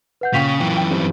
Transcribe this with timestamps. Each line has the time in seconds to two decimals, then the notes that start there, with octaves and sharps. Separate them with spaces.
0.21 B4 F#5 G6
0.34 A#2 C#3 F5 G5 C#6 B6 F7
0.60 F#2 E3
0.76 G5
0.90 G2 C4